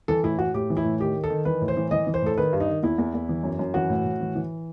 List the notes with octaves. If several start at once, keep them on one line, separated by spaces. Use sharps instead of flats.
E3 A4
A2 E4
A2 F#4
A2 G4
E3
E4
A2
D#3 G4
D#3
A4
D#3
E3 B4
A2
C5
E3
E3 D#5
E3
C5
A2 A4
D#3 B4
G2
D#4
D#3
E2 E4
E2
E2
E3
F#2
F#2
E3 F#4
A2
A2
E3
E3